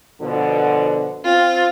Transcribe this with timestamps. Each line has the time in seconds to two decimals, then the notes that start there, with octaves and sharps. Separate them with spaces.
0.21 B2 D3 F3
1.25 C4 F4